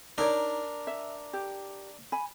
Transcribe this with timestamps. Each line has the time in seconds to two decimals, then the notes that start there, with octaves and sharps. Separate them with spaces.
0.18 D4 D#4 A#4 C#5 D5
0.87 E5
1.33 G4
2.12 G#5 B5